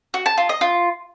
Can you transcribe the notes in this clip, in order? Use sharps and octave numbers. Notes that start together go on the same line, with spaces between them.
F#4
A5
F4
D#5
F4